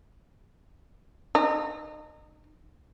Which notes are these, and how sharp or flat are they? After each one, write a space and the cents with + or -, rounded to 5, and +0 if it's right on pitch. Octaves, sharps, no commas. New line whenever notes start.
D#4 -30